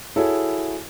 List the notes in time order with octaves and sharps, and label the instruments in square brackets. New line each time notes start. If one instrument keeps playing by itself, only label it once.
[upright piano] E4 F#4 G#4 A4 C#5